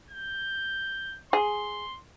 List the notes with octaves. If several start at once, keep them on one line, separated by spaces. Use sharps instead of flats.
G6
G#4 C6